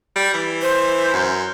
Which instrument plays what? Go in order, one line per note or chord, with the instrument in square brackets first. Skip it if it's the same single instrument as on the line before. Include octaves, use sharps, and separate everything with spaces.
[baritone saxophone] G3
E3
[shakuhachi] C5
[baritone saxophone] F#2